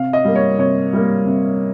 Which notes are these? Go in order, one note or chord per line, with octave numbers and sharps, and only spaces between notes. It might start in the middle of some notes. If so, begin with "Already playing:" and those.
Already playing: C3 F5
D#5
G3 A#3
C#5
C3 C#5
G3 A#3
C3